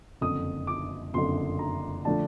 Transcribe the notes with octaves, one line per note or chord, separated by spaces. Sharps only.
F#1 F2 D3 D#6
D6
F#1 F2 D3 C6
A#5
D3 F3 A3 D4 A5